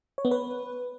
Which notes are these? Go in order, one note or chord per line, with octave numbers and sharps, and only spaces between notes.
C#5
B3
B4